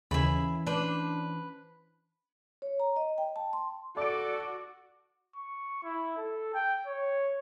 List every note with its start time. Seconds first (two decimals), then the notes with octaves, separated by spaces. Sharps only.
0.11 D#2 C#3 E3 C#4 E4 G#4 B5
0.67 D4 B4 C5
2.62 C#5
2.80 A#5
2.96 D#5
3.18 G5
3.36 A5
3.53 C6
3.97 F#4 A4 D5 D6 D7
5.36 C#6
5.83 E4
6.17 A4
6.54 G5
6.87 C#5